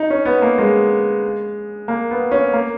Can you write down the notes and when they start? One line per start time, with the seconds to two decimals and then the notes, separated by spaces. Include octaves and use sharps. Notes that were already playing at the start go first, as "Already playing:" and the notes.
Already playing: D#4
0.10 C#4
0.25 B3
0.42 A#3
0.58 G#3
1.88 A#3
2.11 B3
2.31 C#4
2.53 A#3